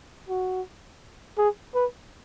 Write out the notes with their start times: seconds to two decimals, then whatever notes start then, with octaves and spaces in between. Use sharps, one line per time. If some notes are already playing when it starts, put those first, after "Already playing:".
0.29 F#4
1.38 G#4
1.74 B4